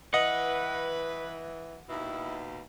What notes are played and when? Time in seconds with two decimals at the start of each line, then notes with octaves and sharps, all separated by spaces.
0.14 E3 B4 D#5 F#5
1.89 D#2 B2 E4